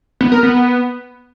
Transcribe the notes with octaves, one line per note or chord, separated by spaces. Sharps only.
B3
A#4
B3